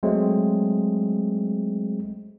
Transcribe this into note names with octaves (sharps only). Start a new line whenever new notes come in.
F#3 G#3 A3 C4